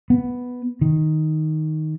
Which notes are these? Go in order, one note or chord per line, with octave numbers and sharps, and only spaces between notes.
B3
D#3